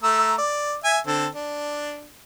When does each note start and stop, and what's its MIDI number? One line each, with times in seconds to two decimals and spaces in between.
0.03 0.35 57
0.03 0.35 82
0.03 0.35 88
0.38 0.75 74
0.84 0.99 76
0.84 0.99 80
1.07 1.27 50
1.07 1.27 60
1.07 1.27 69
1.35 2.05 62